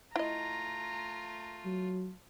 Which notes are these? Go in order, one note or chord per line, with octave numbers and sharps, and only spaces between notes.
A3 E4 F4 D#5 A#5
F#3